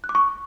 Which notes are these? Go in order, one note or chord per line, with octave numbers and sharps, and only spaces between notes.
F#6
D6
C#6